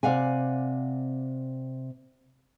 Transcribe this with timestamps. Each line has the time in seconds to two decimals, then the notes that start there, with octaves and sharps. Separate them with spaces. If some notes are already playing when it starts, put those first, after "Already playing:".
0.03 C3 D5 F5 F#5 G#5